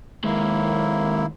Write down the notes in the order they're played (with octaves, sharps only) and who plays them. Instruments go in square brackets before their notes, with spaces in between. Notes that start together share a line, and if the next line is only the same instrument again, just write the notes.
[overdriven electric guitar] D#2 G#3 [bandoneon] A#3 E4